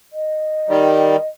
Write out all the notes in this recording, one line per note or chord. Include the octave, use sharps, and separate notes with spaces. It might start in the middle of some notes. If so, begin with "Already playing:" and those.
D#5
D#3 G3